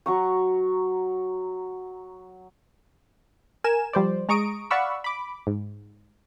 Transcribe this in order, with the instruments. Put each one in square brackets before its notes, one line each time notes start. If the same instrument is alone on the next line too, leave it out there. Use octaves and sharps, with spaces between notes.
[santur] F#3 A#5 C#6
[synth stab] A#4 G#5 E7
F3 G3 C5 D5
G#3 A#5 C#6 D#6 D7
D5 F5 F#5 B5 C#6 E6
B5 D6
G#2